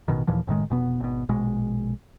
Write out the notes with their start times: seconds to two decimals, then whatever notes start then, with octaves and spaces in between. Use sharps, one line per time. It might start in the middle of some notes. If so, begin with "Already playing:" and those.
0.08 A1 G#2 B2 D#3
0.27 D#2 A#2 E3 F3
0.47 F#1 A2 D#3 G#3
0.70 F1 B2 B3
1.00 G#1 B2
1.29 A#1 B2 G#3